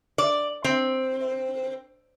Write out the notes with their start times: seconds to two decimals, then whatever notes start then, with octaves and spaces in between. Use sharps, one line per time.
0.18 D5
0.64 C4